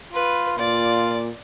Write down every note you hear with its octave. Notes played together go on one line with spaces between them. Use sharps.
F4 B4
A#2 F4 D5